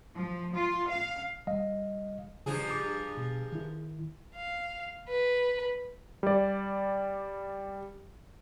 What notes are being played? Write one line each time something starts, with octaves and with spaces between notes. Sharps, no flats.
F3
F4
F5
G3 D#5 F5
G2 C#3 F3 G#4
D6
B2
D#3 E4
F5
B4
G3 D5